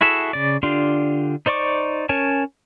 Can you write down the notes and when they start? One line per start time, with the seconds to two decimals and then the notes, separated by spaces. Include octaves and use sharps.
0.01 E4 F#4 G#4 A4 E5
0.33 C#3 D5
0.63 D3 D4 F4 G4 C6
1.46 D#4 C5 D5 C#6 D6
2.09 C#4 A#4 C#5 G#5 A5